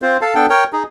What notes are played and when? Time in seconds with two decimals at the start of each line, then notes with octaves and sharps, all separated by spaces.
0.02 C4 F4 C5
0.22 A4 F5 A5
0.35 B3 D4 A4 G5
0.50 A#4 C#5 G5
0.73 D#4 G#4